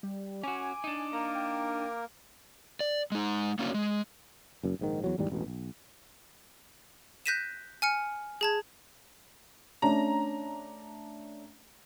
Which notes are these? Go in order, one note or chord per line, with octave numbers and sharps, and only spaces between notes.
G3
C#4 F#4 G#5 D6
D4 D#4
A#3 A#4 A#5
G5
D5
G#3 D#4
A#3 C#4 D4 F#4 C#5
G#3
F#1 F#2
A#1 G#2 D#3
E2 F#3
D#2 G#2 E3 G3
E1 A1 B2
B1
F#6 G6 A#6 B6 D#7 E7
G#5 F6 C#7
G#4 A5 G#6
A3 C#4 D4 A#5